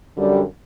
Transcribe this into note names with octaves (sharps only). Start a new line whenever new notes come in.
F#2 D3 G3